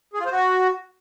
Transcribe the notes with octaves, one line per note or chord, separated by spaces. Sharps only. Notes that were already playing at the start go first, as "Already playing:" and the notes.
G#4
F4
C5
F#4